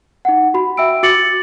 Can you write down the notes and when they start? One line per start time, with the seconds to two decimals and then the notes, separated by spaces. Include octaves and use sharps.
0.25 D#4 F#5
0.54 F#4 B5
0.77 E5 G5 E6 D7
1.03 F#4 D6 A6 C#7 F#7